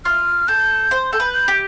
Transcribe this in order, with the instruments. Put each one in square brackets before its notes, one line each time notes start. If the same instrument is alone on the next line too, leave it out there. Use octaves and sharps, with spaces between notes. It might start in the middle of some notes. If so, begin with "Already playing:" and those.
[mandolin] F4 [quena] F6
[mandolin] A4 [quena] G6
[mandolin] C5
[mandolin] A4 [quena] G6
[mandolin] B4
[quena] G6
[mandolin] G4